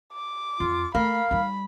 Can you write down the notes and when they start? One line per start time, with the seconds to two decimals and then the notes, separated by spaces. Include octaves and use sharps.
0.13 D6
0.60 F2 F4
0.95 A3 A#3 F5 B5
1.31 G3 D#4 B5